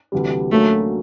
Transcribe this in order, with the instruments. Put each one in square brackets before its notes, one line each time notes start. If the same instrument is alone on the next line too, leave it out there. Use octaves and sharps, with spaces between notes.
[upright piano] D2 C3 E3 G3
[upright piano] D2 D3 F#3 A#3 C#4 [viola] A3